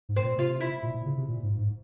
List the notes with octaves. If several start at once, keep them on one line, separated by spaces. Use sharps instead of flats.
G#2
C4
A#2
C3 F4
E4
A#2
A#2
C#3
C3
A#2
G#2
G#2